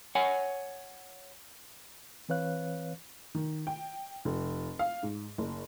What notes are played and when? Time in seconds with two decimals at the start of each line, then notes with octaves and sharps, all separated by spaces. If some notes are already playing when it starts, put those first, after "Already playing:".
0.15 C#5 F#5 G#5
2.29 E3 C4 B4 C#5 F5 F#6
3.35 D#3
3.67 G5
4.25 F1
4.79 F5
5.03 G#2
5.38 F#1